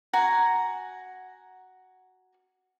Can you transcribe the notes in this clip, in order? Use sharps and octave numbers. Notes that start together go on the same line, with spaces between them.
F#4 F#5 G#5 A#5